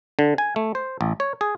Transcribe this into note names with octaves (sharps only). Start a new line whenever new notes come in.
D3
G#5
A3
C5
A1
C#5
G#4